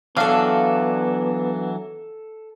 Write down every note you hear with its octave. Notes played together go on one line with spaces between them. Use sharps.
E3 F#3 B3 D4 A4 F5